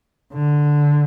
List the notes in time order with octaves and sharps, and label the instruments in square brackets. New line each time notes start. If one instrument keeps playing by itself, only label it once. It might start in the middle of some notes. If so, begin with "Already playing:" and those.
[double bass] D3